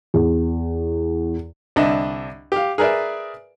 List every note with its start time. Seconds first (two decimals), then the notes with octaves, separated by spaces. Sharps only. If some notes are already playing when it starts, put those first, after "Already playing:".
0.14 E2
1.76 C2 D3 D4 D#5 E5
2.52 G4 F5
2.78 G#4 A#4 B4 D5 E5